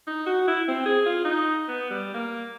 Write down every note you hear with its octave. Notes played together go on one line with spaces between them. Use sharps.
D#4
F#4
E4
C4
G#4
F4
D#4
B3
G3
A#3